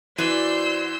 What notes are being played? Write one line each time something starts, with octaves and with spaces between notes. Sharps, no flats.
E3 F#4 C5 D5 C6 E6 G6 D#7